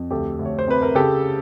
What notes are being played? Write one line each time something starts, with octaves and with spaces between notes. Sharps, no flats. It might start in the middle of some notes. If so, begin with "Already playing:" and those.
Already playing: F2
D2 G4 A4
D2
C#5
C5
C3 B4
A#4
C#3 G4 A4